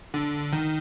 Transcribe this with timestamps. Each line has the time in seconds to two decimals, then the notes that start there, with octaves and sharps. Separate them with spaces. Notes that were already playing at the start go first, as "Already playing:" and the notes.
0.14 D3
0.53 D#3